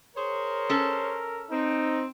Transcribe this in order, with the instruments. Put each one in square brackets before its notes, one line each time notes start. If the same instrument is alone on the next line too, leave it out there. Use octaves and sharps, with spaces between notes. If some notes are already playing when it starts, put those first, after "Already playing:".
[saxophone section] G#4 C5 C#5 [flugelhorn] A#4
[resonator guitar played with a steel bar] C#4 A4
[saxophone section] C4 [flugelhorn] D#4